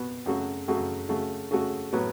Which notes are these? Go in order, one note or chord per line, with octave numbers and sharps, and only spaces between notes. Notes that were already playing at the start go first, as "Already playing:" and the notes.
Already playing: B2 B3 F#4
F#2 C#3 A3 F#4
F#2 C#3 A3 F#4
C#3 A3 F#4
C#3 A3 F#4
A2 F#3 B3